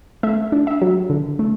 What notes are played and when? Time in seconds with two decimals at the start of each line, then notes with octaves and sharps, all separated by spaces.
0.23 A3 E5
0.52 D4
0.67 E5
0.82 F#3
1.10 D3
1.39 A3